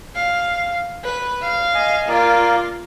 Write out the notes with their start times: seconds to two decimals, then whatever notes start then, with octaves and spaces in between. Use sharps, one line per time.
0.15 F5
1.04 B4
1.42 F5
1.75 D#5 G#5
2.09 A#3 F4 A#4 D5